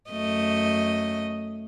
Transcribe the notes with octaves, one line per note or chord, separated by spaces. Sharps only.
F#2 A3 D#5